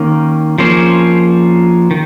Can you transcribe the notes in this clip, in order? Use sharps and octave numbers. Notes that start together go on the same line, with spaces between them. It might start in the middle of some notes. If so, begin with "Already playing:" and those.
Already playing: D#3 A#3 C#4
F3 A#3 C#4 G#4 C5
D#3